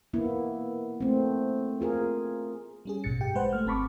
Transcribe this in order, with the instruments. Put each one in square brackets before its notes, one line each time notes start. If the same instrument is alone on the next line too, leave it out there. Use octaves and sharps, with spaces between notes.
[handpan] A#3 B3 E4
A3 C4
F4 G#4 A#4
[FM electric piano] G3 C#4 G#4
A1 G2 B2 A6 C#7
G4 G5
G#3 B4 C5 F#5
A3 F6
G1 C4 A5 B5 C#6 D6